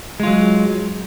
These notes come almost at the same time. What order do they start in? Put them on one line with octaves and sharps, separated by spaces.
G#3 F4 F#3